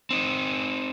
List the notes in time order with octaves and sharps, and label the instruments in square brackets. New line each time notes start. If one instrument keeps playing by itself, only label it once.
[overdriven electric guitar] C4 D#4